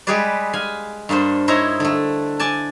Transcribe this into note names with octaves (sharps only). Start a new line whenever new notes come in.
G3 G#3 G4 G#4 B4 D5
F5 G#5 B5
G2 A#3 D4 C5
D#4 E4 C5 C#5 A#5
D3 A3
D5 G#5 A5